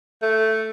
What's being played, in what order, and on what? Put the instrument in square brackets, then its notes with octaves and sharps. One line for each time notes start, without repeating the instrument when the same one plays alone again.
[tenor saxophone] A3